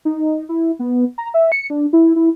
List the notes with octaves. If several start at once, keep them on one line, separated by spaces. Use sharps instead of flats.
D#4
E4
B3
A#5
E5
C#7
D4
E4
E4